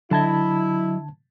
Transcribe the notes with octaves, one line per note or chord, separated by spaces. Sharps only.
D3 F#3 E4 D#5 A5 G#6